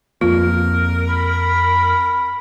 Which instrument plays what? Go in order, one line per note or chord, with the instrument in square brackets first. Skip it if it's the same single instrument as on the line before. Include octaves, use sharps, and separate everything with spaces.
[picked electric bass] F2 F3 A#3 [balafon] F4 [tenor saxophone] A#4
[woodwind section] B5